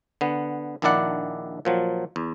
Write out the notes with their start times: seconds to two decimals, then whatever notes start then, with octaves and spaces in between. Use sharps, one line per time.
0.21 D3 B3
0.82 A#1 D#3 D4 E4 D5 F#5
1.65 A#2 F3 F#3
2.16 E2